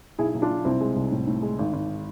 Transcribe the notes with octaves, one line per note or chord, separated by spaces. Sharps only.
B1 E4 G#4
B1
D4 F4
B1
C2 C4 E4
G#3
C2
A2
A2
G#3
G#1
G#1